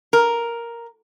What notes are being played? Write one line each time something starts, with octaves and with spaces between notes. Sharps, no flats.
A#4